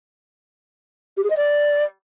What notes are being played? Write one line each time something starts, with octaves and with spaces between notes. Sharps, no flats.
G4
G#4
D#5
D5